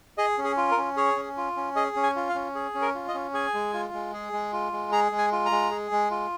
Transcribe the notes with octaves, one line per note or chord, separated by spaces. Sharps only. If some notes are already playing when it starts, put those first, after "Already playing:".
G#4 D#5
C#4
G#4
F4
A#4
C#4
G#4 C#5
C#4
F4
C#4
G#4 D#5
C#4
G#5
F4
F5
C#4
G#4
C#4
A#4
F4
D#5
C#4
G#4 G#5
G#3
F4
G#3
G#4
G#3
F4
G#3
G#4 A#5
G#3
G#5
F4
A#5
G#3
G#4
G#3
F4